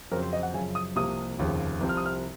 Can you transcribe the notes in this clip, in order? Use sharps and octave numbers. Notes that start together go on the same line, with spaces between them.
F2 C#3 F#3 C4 A#4
C5
D#5
F#5
F#2 C#3 F3 G#5
D#6
C2 C3 F3 A#3 D#6
F1 D#2 C#3 F3
C2 C3 F3 C4
F6
D#6
F6